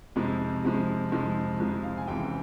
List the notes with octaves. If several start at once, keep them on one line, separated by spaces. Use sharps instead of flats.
F2 C3 F3 G#3
F2 C3 F3 G#3
F2 C3 F3 G#3
F2 C3 F3 G#3
F5
G#5
C#2 C3 E3 G5